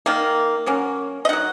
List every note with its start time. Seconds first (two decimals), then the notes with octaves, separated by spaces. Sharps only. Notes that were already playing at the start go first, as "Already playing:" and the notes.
0.06 D#3 A#3
0.66 F#3 A#3 C#4
1.25 D#5
1.29 F#3 D#4 F#5